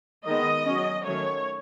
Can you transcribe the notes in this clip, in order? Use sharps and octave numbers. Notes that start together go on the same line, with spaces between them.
D#3 G#3 B3 D#5
F#3 C#4
D#3 F#3 A3 C#4 C#5